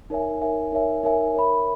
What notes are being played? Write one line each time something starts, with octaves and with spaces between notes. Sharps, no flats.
D#4 A#4 C#5 E5 G#5
D#4 A#4 C#5 E5 G#5
D#4 A#4 C#5 E5 G#5
D#4 A#4 C#5 E5 G#5
A#4 C#5 E5 B5